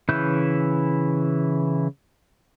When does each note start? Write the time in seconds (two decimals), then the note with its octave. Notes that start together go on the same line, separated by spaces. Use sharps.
0.09 C#3 E3 E4 F#6 G6